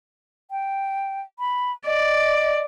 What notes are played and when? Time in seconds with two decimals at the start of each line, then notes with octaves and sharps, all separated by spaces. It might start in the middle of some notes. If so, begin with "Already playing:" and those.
0.51 G5
1.39 B5
1.86 D5 D#5